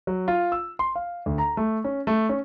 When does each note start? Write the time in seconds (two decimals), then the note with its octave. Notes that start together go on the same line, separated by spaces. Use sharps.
0.07 F#3
0.28 F4
0.52 E6
0.79 C6
0.95 F5
1.26 D2
1.38 A#5
1.57 A3
1.84 C#4
2.07 A3
2.29 C#4